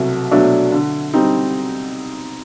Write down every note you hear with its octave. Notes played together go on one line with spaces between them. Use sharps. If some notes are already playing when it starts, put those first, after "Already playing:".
Already playing: C2 B2 F#3 A3
B2 F#3 A3 D4
D3
G3 C4 D#4